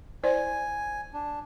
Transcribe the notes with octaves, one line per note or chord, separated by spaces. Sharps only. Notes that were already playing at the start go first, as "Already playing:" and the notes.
E4 C5 D5 G#5
D4